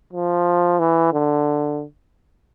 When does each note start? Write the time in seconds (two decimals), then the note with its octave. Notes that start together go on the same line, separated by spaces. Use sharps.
0.13 F3
0.79 E3
1.13 D3